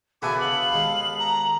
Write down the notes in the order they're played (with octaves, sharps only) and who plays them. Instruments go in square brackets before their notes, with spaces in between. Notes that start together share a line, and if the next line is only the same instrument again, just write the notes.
[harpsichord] C#3 E4 F#4 [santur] B3 A4 [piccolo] G#5 [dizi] D6
[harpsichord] D3 [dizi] F5 [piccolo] F#7
[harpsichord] D#2 G#3
[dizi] A#5